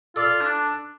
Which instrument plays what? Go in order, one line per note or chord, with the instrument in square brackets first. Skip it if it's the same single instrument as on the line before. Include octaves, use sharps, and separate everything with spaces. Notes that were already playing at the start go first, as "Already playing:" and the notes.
[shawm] F4 [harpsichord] A4 D5
[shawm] D4